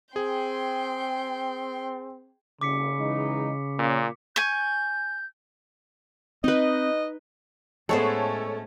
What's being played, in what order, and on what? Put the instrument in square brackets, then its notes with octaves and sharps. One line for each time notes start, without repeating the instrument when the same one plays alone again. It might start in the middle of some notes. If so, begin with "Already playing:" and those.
[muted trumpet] C4 [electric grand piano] G#4 [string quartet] G5 C6
[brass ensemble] F#1 C2 [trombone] C#3 [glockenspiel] D6 B6 C#7
[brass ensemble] E3 G#3 D#4
[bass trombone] A#2 [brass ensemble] A#3 C#4
[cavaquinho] G#5 C#6 [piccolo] G6
[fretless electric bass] C4 [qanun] D#4 B4 [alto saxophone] D#5
[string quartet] A2 A3 C#4 [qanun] G#3 B3 C5 [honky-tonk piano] A4 C#5